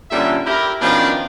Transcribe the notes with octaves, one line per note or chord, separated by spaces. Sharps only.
A#2 D3 G3 C#4 E4 E5
E4 G4 A#4
B2 D#3 F3 C#4 D4